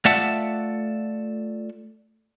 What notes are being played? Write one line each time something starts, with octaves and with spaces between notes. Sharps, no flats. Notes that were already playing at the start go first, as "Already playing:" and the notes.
A3 F4 D5 E5 F#5 A5